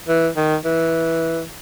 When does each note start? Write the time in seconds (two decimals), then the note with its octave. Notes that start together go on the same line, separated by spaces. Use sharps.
0.08 E3
0.36 D#3
0.65 E3